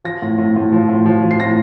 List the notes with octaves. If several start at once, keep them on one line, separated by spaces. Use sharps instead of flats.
F3 A#6
A2
A2
A2
F3
A2
F3
F3
C7
A2 A#6